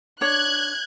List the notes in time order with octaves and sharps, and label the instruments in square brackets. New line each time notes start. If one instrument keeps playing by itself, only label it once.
[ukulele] D4 C#5 [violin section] F#6 G#6